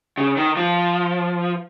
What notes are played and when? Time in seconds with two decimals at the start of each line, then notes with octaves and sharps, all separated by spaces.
0.17 C#3
0.36 D#3
0.57 F3